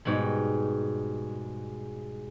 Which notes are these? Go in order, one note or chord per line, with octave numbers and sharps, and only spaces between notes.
G#2 B2 G3 B5